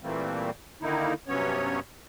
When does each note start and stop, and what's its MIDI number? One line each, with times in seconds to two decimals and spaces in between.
0.02 0.50 46
0.02 0.50 52
0.02 0.50 55
0.02 0.50 57
0.02 0.50 58
0.02 0.50 60
0.82 1.14 50
0.82 1.14 51
0.82 1.14 58
0.82 1.14 63
0.82 1.14 64
1.28 1.80 43
1.28 1.80 48
1.28 1.80 54
1.28 1.80 59
1.28 1.80 61
1.28 1.80 73